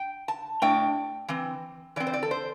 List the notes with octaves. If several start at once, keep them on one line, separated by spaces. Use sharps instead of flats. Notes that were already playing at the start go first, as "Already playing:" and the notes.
Already playing: G5
A5
A2 A3 D4 G5
E3 C4
E3 C4 D5
C5
D5
A4
C5